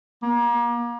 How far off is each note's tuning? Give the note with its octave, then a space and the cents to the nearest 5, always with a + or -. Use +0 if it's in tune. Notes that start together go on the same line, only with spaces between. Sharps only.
A#3 +35